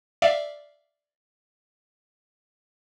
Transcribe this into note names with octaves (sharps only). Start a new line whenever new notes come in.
D5 E5 F5